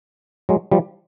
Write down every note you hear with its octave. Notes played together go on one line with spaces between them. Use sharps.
F#3 G#3
F3 G3